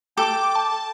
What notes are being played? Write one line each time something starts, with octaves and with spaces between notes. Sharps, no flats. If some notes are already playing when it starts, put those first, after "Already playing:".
A4 G5 D6
A5